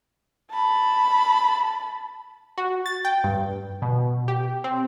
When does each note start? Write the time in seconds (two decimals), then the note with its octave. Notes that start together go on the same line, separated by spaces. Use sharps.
0.51 A5 B5
2.58 F#4
2.86 A6
3.05 G5
3.24 G2
3.82 B2
4.28 G4
4.64 C4